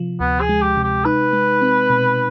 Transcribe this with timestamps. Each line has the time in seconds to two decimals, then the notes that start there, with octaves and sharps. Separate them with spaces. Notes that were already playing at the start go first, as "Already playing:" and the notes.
Already playing: C3 F3
0.20 D2 B3
0.41 G#4
0.49 G#3
0.62 G4
0.77 C3
0.84 G4
1.05 D#4 B4
1.33 G#3
1.62 C4
1.90 B2